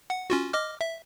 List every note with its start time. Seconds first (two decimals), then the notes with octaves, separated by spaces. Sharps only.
0.10 F#5
0.30 C#4 F4 F#4
0.53 D#5 D6 F6
0.81 E5